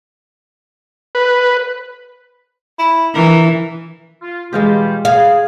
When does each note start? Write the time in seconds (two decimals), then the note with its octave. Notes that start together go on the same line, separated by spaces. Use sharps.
1.15 B4
2.79 E4
3.15 E3 A#4
4.22 F4
4.53 B2 E3 G3 G#3 F4 G4
5.05 G#4 F5